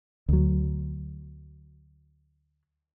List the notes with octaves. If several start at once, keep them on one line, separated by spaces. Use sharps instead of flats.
D2 F#3